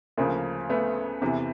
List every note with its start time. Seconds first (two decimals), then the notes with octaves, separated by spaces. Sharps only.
0.18 D2 C#3 F3 A#3
0.70 A3 B3
1.21 E2 C3 E3